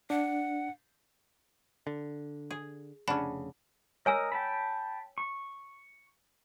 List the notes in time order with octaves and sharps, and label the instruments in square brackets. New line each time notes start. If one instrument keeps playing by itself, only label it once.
[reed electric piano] D4 [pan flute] F#5
[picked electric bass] D3
[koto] G#4
[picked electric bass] F1 C#3 [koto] C#4 D4 [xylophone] F#5 A5 B5
[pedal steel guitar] A#4 D#5 [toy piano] C#5 G#5 E6
[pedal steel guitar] G5 A5 B5
C#6